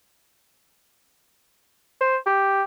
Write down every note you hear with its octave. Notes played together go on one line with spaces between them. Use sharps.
C5
G4